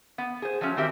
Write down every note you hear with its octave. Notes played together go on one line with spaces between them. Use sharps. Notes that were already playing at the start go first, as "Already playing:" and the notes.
B3
G#4 C5
F3 F#3 A3 C#4
D#3 C4 G4 E5